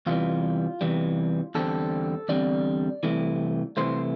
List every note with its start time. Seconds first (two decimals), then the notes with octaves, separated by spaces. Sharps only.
0.06 E2 C3 E3 G3 F4
0.81 E2 C3 E3 G3
1.55 E2 D3 G3 C4 A4
2.29 E2 D3 G3 C4 D5
3.03 C2 C3 E3 A3
3.77 C2 C3 E3 A3 C5